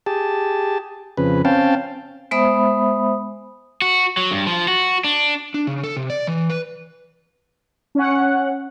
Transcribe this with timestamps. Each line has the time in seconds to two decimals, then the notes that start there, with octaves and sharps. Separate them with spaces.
0.06 G4 G#4 A5
1.17 F2 C#3 B4
1.45 C4 C#4 F5 G5 A5
2.31 G#3 B3 C5 E5 B5 D#6
3.82 F#4
4.17 F#3
4.31 G2
4.47 F3
4.68 F#4
5.04 D4
5.54 D4
5.67 C#3
5.84 A4
5.97 C3
6.10 D5
6.27 E3
6.50 B4
7.95 C#4 F#5